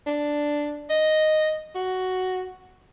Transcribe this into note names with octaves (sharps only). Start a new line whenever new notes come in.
D4
D#5
F#4